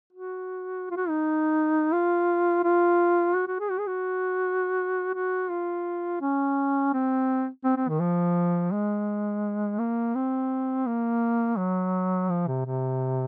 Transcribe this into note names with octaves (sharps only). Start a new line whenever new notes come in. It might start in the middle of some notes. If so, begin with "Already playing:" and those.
F#4
F4
F#4
D#4
F4
F4
F#4
F#4
G#4
F#4
G#4
F#4
F#4
F4
C#4
C4
C4
C4
D#3
F3
G#3
A#3
C4
A#3
F#3
F3
C3
C3